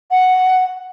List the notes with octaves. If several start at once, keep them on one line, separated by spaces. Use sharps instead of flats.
F#5